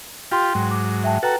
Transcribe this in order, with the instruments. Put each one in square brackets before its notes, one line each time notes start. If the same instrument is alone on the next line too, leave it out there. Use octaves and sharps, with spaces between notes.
[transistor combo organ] F4 G4 [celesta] G5 C6
[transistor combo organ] G#2 F#3
[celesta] D6
E5 G5 A5
[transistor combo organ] F#4 A4 [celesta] B4 G5 A#5